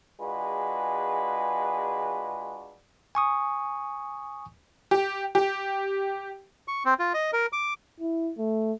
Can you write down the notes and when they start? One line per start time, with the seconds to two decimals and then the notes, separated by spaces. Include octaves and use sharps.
0.20 G#3 D4 F4 F#4 G#4 B4
3.15 G#5 C#6 D#6
4.91 G4
5.35 G4
6.68 C#6
6.85 C4
6.99 F4
7.14 D#5
7.33 A#4
7.53 D6
8.00 E4
8.38 A3